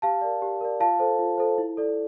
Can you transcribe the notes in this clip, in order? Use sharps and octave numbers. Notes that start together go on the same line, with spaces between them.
G4 F5 A5
A#4 D5
G4
A#4 D5
F4 F5 A5
A4 C5
F4
A4 C5
E4
A4 D5